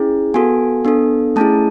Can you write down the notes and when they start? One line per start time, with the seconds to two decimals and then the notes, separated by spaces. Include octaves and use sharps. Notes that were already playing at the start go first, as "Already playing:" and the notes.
Already playing: C#4 E4 G#4
0.34 B3 F#4 A4 G#5
0.85 B3 D4 A4
1.36 A3 C#4 E4 G#4 A5